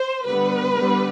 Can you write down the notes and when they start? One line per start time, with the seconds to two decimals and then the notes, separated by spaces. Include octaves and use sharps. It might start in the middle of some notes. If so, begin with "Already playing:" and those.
Already playing: C5
0.25 D3 G3 B3 B4
0.74 D3 G3 B3